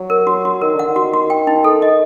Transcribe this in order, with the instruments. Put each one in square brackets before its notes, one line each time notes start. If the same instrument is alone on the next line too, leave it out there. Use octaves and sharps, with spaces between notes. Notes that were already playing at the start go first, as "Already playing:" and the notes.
Already playing: [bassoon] F#3
[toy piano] A#4
F#4
F#4
[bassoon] D#3 [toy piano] A#4
[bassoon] D3 [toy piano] F#5
[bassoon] D#3
[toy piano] F#4
F#4
G5
D#4
A4
D#5